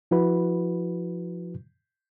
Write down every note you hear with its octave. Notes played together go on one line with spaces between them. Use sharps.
F3 E4 F#4 B4 B5